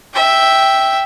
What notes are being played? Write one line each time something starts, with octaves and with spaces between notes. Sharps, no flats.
E5 G5